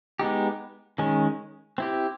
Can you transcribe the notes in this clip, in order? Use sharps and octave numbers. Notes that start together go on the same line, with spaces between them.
G#3 B3 D#4 G4
D#3 G#3 C#4
C4 E4 G4